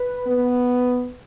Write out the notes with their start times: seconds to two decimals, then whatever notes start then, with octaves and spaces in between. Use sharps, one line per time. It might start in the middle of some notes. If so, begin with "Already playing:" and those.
Already playing: B4
0.28 B3